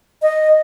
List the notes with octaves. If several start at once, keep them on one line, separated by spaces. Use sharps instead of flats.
D#5